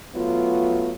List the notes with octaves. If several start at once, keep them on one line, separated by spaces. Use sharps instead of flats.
F#3 A3 B3 F4